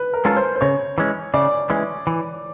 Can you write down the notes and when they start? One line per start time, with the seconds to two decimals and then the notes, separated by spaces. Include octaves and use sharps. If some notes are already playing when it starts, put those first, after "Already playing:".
Already playing: B4
0.13 A#4
0.25 G#3 C#4 F4 A4
0.37 C5
0.56 C5
0.61 C#3 C#5
0.98 E3 G#3 C#4
1.34 C#3 D5
1.70 E3 G#3 C#4
2.07 E3